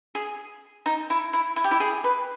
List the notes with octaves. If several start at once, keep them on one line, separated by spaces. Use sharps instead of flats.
G#4
D#4
E4
E4
E4
G4
E4
G#4
B4